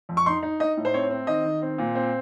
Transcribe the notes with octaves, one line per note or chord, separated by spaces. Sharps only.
F2
C#6
D#4 C6
D#4
D#4 D#5
A2
C5
C4 C#5
C4
D#3 D#5
D#3
C4
A#2
C4